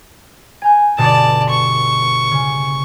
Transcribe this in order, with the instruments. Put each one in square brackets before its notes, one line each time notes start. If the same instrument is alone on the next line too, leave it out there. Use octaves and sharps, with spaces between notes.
[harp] G#5 A#5 G6
[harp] G1 B2 A4 [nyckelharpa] D5 A5
[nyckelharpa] C#6
[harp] C#3